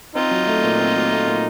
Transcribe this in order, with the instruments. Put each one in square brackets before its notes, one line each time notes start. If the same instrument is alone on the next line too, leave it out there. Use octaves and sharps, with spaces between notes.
[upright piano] C4 [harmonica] D#4 F4
[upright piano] F#3
A3
A#2
C4
F#3
A3
A#2